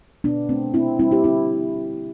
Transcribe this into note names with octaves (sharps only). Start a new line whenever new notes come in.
B2 B3 D4
A3 C4
B2 C4 E4
G3 C4 E4
E4 G4
D3 C4 E4